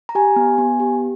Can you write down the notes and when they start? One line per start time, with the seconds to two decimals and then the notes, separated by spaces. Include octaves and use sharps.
0.09 A#5
0.15 G4 G#5
0.36 B3
0.58 B3
0.80 G4